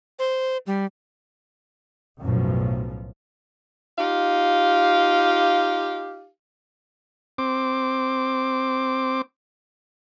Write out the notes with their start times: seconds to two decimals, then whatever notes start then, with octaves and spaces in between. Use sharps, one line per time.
0.19 C5
0.67 G3
2.21 B1 F#2 A2 F3
3.98 D#4 F4 G4 F5
7.38 C4 D6